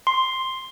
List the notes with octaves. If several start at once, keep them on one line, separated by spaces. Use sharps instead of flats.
C6